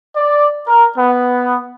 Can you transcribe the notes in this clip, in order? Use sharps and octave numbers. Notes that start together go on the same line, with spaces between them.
D5
A#4
B3